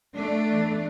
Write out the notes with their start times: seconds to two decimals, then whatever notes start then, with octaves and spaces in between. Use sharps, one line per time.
0.15 A3 D4
0.49 E2 E3